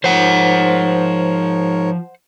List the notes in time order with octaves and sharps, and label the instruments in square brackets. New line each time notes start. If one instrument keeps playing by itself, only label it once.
[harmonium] G#2 A#4 C#5 [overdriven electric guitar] F3 [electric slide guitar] C5 F#5